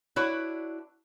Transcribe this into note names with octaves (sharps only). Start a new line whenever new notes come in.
D4 E4 F#4 B4 C#5